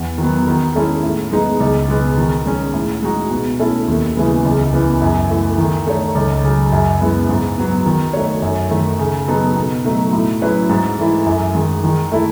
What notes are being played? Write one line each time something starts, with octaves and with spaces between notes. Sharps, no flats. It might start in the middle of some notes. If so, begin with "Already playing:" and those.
Already playing: E2
D#3 F#3 B3
D#3
G#3 C#4 E4 A4
A2
G#3 B3 D#4 G#4
C#2
B2 G#3 B3
D#3
G#3 C#4
A2
G#3 D#4 F#4
B2
A3 C#4 E4 A4
D#2
C#3 E3 G#3 B3
C#2
C#3 E3 B3
F#2
E3 A3
D#3
A3 D#4 A4 C#5
C#2
C#3 F#3
F#2
C#3 G#3 B3 E4
G#2
F#3 B3
D#3
A3 D#4 F#4 C#5
F#2
D#3 A3
C#3
F#3 B3 D#4 A4
B2
F#3 A3 D#4
A2
F#3 C#4 E4 B4
G#2
E3 A3 E4
F#2
D#3 G#3
D#3
A3 E4 A4